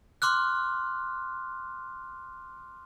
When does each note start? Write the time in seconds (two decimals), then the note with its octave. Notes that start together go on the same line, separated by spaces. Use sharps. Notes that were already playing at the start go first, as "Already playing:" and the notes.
0.22 C6 D6 F6 F#6